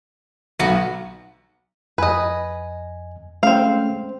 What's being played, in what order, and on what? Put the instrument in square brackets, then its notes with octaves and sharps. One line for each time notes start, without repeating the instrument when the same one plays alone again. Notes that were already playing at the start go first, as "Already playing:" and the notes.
[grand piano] B1 C#7 [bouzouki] A3 B3 F#4
[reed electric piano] F2 G#5 [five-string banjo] B4 D#5
[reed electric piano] G#3 A3 C#4 [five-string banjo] C4 F5